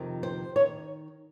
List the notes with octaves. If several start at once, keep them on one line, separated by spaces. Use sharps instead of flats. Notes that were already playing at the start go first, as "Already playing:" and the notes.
Already playing: F2 C3 D#3
C5
D#3 C#5